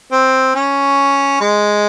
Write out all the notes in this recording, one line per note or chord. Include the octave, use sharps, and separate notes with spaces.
C4
C#4
G#3